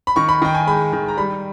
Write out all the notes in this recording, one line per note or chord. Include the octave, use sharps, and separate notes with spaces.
B5
D#3 C#6
B5
D#3 G5
G#5
G#3 B5
D#3
A#5
G3 B5